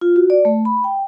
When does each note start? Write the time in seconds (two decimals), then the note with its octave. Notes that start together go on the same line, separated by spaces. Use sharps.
0.01 F4
0.16 F#4
0.30 D5
0.45 A3
0.65 B5
0.84 G5